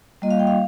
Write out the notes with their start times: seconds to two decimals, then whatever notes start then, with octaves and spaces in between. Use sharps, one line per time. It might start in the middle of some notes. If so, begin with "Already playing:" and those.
0.22 G3 A#3 F4 D#5
0.30 F5
0.39 G5
0.47 F5